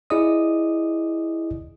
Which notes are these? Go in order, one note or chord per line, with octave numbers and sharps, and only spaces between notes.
E4 G#4 D5 D#5 D#6